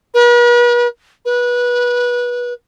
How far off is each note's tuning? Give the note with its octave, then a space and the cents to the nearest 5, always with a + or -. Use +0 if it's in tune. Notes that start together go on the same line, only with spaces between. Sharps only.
B4 -45
B4 -20